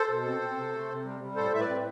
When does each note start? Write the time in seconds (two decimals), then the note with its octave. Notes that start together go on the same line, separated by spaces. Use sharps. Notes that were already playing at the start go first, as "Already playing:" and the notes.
Already playing: A4 C5
0.09 B2
0.25 C4
0.41 C4
0.57 C3
0.73 A3
0.89 C3
1.04 G3
1.20 G3
1.36 A2 A4 C5
1.52 A2 E5
1.60 B4 D5
1.68 C4